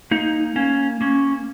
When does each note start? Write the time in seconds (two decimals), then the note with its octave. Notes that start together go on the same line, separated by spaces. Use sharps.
0.11 A#3 D#4
0.56 A#3 C#4
1.01 A#3 C#4